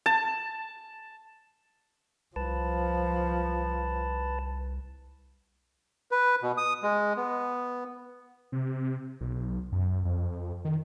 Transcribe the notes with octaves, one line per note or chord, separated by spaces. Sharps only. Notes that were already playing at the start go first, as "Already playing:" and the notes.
A5
C2 F3 B4 A5
B4
B2
D#6
G#3
B3
C3
B1
F#2
F2
D#3